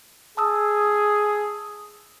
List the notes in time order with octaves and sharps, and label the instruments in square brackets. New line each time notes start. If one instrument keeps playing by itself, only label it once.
[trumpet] G#4 [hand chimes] A5 D#6 E6